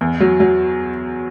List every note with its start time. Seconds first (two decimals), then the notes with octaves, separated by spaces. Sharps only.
0.01 E2
0.20 F#3
0.40 F#3